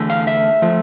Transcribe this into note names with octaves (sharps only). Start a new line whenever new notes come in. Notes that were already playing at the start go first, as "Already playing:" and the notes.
Already playing: E2 D3 A3
F5
E5
F3 A3